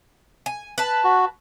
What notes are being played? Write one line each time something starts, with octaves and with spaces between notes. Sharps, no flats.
G#5
B4 A5
F#4